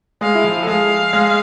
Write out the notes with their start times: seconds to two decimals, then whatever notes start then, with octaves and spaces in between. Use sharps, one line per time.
0.21 G#3 G#4 F5
0.35 E4
0.44 F3 F4
0.63 A4
0.67 G#3 G#4 F5
1.13 G#3 G#4